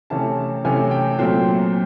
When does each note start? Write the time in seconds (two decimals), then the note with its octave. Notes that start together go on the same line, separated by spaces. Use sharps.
0.10 C3 E3 A3 C#4 A5
0.65 C3 E3 A3 C#4 G#5
0.91 G5
1.19 A#2 F#3 A3 C4